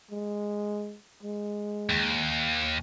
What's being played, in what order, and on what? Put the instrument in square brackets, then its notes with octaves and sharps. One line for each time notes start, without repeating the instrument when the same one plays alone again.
[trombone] G#3
G#3
[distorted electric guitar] D#2